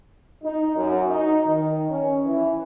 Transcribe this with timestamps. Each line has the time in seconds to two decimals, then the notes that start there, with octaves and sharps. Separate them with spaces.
0.43 D#4
0.76 F#2
1.08 D#4
1.46 D#3
1.91 C#4
2.26 E3